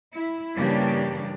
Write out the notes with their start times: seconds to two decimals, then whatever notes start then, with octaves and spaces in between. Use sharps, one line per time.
0.14 E4
0.56 G2 C#3 E3 A#3 D4 G4